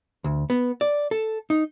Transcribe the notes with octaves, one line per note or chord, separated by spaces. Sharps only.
D2
B3
D5
A4
D#4